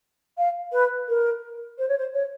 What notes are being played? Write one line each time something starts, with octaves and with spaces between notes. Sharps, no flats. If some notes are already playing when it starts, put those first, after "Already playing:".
F5
B4
A#4
C5
C#5
C5
C#5